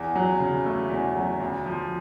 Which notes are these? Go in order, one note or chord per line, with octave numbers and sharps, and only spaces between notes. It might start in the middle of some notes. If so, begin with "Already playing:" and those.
Already playing: E2
F#3
C#3
A3
E2
F#3
D2
F3